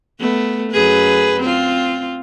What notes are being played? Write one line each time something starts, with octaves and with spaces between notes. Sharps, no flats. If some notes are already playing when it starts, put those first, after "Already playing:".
A3 B3
F#2 G#4 B4
C4 F4